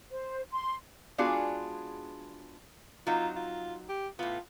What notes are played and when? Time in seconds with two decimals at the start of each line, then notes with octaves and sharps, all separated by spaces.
0.10 C5
0.51 C6
1.18 G#3 B3 D4 F4 F#4 G#4
3.07 F#3 C4 D#4 F4
3.36 F4
3.89 G4
4.19 A2 B3 F4